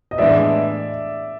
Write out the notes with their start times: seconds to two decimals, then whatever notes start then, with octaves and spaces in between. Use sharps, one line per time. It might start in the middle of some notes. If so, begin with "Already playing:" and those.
0.11 D#5
0.18 A2 E3 G#3 B3 D4 D5 E5